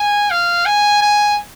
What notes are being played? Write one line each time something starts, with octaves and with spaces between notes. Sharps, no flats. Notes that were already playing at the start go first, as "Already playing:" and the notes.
Already playing: G#5
F5
G#5
G#5